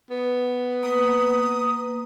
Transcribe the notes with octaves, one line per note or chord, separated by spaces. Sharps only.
B3
A#3 B4 D#6